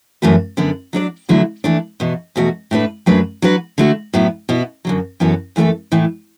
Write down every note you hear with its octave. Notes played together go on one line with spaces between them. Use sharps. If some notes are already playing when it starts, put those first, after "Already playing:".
F#2 E3 A3 F#4 B4
F#2 D3 B3
F#3 D4 A4 D5
E2 D3 F#3 A3 E4
E3 A3 D4
E2 B2 B3
E2 B2 A3 F#4
A2 A3 D4 B4
F#2 F#3 A3 D4 B4
F#3 D4 F#4 B4
D3 A3 F#4
A2 F#3 B3 E4
B2 B3 E4
F#2 D3 F#3
F#2 E3 B3 F#4 A4
F#2 E3 A3 F#4 A4
A2 E3 A3